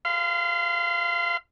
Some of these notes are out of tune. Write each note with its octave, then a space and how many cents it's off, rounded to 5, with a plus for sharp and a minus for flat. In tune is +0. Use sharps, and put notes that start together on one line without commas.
F5 -20 C6 -40